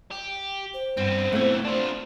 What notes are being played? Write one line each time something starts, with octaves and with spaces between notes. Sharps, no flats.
G4
C5
G2 B3 C4
B1 E3 A3 B3 C4
D4 F4